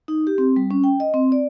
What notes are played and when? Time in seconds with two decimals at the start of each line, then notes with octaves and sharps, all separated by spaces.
0.08 D#4
0.27 G4
0.38 C4
0.56 G3
0.71 C#4
0.84 G5
1.00 D#5
1.14 C4
1.32 D5